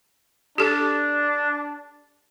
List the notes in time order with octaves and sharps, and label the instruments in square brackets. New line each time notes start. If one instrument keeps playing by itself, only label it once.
[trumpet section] D4 [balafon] G4 A4